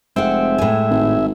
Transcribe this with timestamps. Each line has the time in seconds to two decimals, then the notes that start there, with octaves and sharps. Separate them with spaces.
0.16 F1 G#3 C4 E5 F#5
0.58 A2 G#5
0.90 G#1